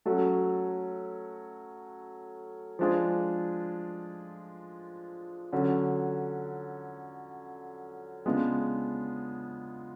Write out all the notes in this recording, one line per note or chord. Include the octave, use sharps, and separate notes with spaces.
F#3 A3 C#4 F#4 A4
F3 G#3 D4 F4 G#4
D3 F#3 C#4
C#3 G#3 B3 D4 F4